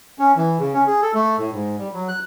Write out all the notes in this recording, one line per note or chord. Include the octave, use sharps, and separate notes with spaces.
C#4
E3
C#3
C#4
G#4
A4
A3
A2
G#2
G3
F#3
F#6